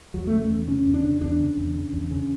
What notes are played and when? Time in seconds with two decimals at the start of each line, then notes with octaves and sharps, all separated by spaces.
0.14 E2 F#3
0.27 A3
0.33 C#3
0.41 A3
0.50 E2
0.68 C#3 C#4
0.85 E2
0.94 D4
1.03 C#3
1.21 E2 D4
1.40 C#3
1.57 E2
1.75 C#3
1.93 E2
2.11 C#3